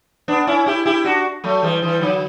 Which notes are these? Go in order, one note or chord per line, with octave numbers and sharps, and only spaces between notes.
B3 D4
C#4 E4
E4 G4
E4 G4
D4 F#4
F#3 A3
E3 G3
E3 G3
D3 F#3